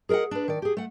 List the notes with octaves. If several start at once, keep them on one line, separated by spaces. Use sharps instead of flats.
G#4 A#4 D5 D#5 F#5
D4 B4
D#3 D5
G4 G#4
A3 F#5